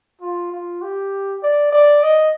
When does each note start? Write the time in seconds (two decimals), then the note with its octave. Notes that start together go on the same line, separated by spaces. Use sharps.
0.21 F4
0.52 F4
0.82 G4
1.43 D5
1.73 D5
2.03 D#5